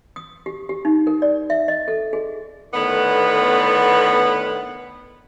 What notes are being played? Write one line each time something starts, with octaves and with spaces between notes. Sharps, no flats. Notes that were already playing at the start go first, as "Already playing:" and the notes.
D#6
G4
G4
D#4
A#4
D5
E5
D#5
A4
G#4
A2 D3 D#3 B3